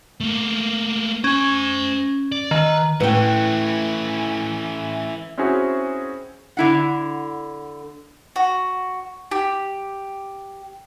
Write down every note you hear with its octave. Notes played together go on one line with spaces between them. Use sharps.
A3 A#3
C#4 C5 G#5
D5
D#3 B4
A2 E3 C#4 B4 F#5 G5
C4 C#4 E4 F#4 G#4
D3 E4 F#5
F#4
G4